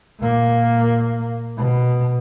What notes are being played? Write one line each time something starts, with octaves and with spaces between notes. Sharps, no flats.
A#2 A#3
B2